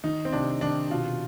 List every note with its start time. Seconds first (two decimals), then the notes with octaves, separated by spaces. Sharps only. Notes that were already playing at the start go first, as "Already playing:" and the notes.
0.04 D#3 D#4
0.25 C4
0.32 C3 D4
0.61 D#3 D4
0.90 B2 F4